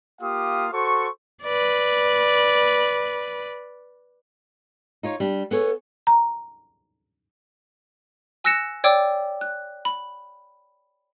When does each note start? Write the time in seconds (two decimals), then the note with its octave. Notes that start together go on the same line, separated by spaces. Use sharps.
0.21 A#3 F4 G4 F5 D#6
0.72 F#4 A4 C5 C#6
1.43 B4 D5
5.03 D#4 F4 C#5
5.20 G3 D4
5.51 B3 G#4 A4 C#5
6.07 A#5
8.44 G#5 E6 F#6 A#6 C#7 E7
8.84 C#5 D5 G5 D6 E6
9.41 F#6
9.85 B5